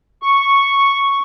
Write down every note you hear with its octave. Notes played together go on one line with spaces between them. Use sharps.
C#6